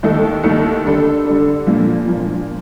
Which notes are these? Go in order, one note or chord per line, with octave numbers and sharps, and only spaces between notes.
D#2 D#3 A3 D#4 A4
D#2 D#3 A3 D#4 A4
D3 G3 D4 A4
D3 G3 D4 A4
A#2 F3 A#3 D4
A#2 F3 A#3 D4